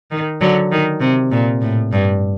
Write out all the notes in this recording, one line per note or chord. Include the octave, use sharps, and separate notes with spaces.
D#3
D3 F#3
D#3
C3
A#2
A2
G2